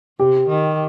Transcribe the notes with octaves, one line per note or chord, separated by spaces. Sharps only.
C3 G4
D#3